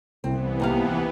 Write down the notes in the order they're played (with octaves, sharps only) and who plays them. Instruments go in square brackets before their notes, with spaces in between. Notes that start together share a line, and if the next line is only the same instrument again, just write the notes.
[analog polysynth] C2 [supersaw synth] E3 B3 [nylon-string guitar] C4
[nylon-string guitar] D#2 C3 F5